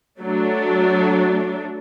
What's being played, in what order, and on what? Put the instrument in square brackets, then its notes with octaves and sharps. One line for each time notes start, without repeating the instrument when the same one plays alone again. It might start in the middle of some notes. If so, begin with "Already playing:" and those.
[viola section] F#3 A3 D4